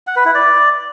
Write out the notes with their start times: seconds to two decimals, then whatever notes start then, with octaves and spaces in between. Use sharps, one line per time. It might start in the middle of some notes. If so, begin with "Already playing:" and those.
0.07 F#5
0.16 B4
0.25 E4
0.34 D5